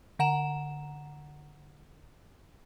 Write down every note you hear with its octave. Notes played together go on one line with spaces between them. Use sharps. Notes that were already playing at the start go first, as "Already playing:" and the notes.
D3 F#5 A#5 E7